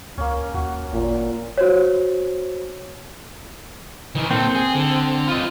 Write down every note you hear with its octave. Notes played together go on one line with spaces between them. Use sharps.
C#2 A#3 C#4
D#2 F#4
G#1 A#2
F#4 C5 C#5
D#3 E3
A#2 C4 A4
G#4
D3
F4 D#5